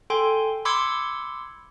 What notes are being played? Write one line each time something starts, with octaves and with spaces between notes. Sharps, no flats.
A4 G5 G#5 C6
B5 C6 D6 E6 G#6 C#7